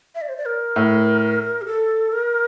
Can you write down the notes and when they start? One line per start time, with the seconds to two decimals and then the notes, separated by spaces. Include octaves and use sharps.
0.15 E5
0.22 D5
0.29 C5
0.37 D5
0.46 A#4
0.76 A2
1.61 G4
1.66 A4
2.12 A#4